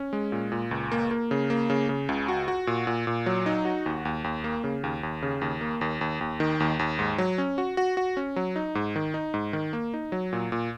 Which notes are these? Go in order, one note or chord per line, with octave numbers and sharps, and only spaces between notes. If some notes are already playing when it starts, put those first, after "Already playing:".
Already playing: C#4
G#3
A#2
A#2
C#2
A#3
A#3
C#3
A#3
C#3
C#3
C#2
F#4
F#4
A#2
A#2
A#2
F#3
D#4
F#4
D#2
D#2
D#2
A#3
C#3
D#2
D#2
C#3
D#2
A#3
D#2
D#2
D#2
D#3
D#2
D#2
G#2
F#3
C#4
F#4
F#4
F#4
C#4
F#3
D#4
G#2
D#3
D#4
G#2
D#3
A#3
D#4
F#3
A#2
A#2